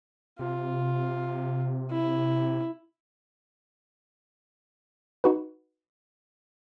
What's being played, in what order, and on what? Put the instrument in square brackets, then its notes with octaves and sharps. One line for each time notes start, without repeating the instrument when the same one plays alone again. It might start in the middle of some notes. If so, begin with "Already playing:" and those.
[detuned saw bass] C3 [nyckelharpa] F4
[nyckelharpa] E4
[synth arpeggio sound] D#4 F#4 B4